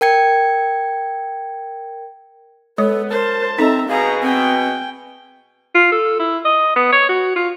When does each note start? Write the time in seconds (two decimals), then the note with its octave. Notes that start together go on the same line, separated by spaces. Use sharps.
0.01 A#4 G5 G#6 C#7
2.78 G#3 B3 A4 C#5
3.10 F#2 A#4 C5 A5
3.59 C4 D#4 A4 D#5 E5 A#5
3.88 B2 G#4 F5 A#5
4.22 C4 G5 G#5
5.75 F4
5.92 A4
6.20 E4
6.45 D#5
6.76 B3
6.93 C#5
7.09 F#4
7.36 F4